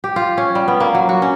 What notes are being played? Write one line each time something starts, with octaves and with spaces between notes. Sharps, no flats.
G4
F4
C#4
G3
B3
A#3
F#3
F#4
C#4